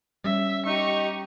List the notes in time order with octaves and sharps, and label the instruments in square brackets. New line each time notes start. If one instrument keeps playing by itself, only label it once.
[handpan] G3 C#4 [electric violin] E5
[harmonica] D#4 [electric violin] G4 C#6